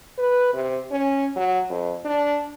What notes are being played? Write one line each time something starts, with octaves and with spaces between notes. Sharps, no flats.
B4
C3
C#4
F#3
F2
D4